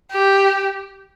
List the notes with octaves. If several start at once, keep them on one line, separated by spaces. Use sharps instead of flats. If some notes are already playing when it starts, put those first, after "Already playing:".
G4